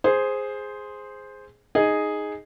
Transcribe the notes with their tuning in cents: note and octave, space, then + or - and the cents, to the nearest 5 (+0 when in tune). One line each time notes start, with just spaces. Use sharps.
G#4 +0 C5 +0
D#4 +0 G#4 +0 D#5 +0